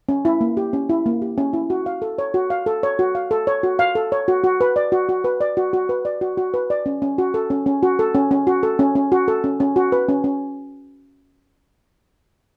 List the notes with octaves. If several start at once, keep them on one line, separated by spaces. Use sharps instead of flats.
C#4
E4
A#3
G4
C#4
E4
A#3
G4
C#4
E4
F#4
F5
A4
C#5
F#4
F5
A4
C#5
F#4
F5
A4
C#5
F#4
F5
A4
C#5
F#4
F#4
B4
D5
F#4
F#4
B4
D5
F#4
F#4
B4
D5
F#4
F#4
B4
D5
C#4
C#4
F#4
A4
C#4
C#4
F#4
A4
C#4
C#4
F#4
A4
C#4
C#4
F#4
A4
C#4
C#4
F#4
B4
C#4
C#4